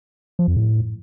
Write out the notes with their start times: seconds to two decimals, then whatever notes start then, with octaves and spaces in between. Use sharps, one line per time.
0.39 F3
0.48 F2
0.57 A2